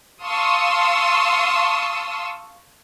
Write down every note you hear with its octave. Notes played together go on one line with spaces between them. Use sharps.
F5 A5 C6 C#6 D#6 E6